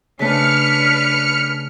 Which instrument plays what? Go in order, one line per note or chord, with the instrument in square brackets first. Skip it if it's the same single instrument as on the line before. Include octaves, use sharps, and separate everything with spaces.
[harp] C#3 A3 [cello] D4 B4 [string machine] F6 C#7